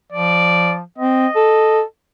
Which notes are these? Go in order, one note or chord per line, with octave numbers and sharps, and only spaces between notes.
F3 D5
C4 D#5
A4